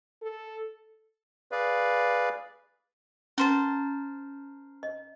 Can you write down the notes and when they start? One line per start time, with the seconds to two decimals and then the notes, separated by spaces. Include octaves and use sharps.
0.22 A4
1.52 G#4 B4 D5 F5
3.38 C#4 A#4 C5 A5
4.83 D#5